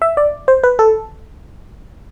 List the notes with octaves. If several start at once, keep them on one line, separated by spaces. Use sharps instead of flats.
E5
D5
C5
B4
A4